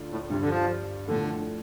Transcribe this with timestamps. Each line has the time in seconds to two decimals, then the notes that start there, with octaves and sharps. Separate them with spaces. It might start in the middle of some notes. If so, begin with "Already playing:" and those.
Already playing: D2 D3 A3 F4 D5
0.11 A2
0.30 G2 C3 G3 D4
0.40 D3
0.49 F3
1.07 A2 D3 F3 A3 D4